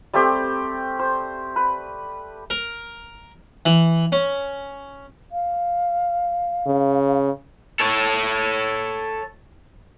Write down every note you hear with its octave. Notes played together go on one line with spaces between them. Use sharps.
G3 A3 C4 G4
C5
B4
A#4
E3
C#4
F5
C#3
A4 C#5